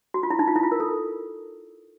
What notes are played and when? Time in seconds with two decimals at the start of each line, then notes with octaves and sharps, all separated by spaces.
0.14 F#4
0.23 F4
0.30 E4
0.39 D#4
0.48 F4
0.56 E4
0.63 F4
0.72 A#4
0.80 A4